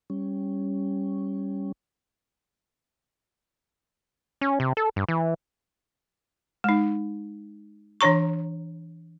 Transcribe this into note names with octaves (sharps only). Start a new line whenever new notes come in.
G3 C#4
C#4
C3
A4
G2
E3
G#3 D#4
E3 D4 C#5 A#5 C#6